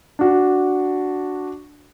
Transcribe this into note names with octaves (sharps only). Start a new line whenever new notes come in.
D4 F#4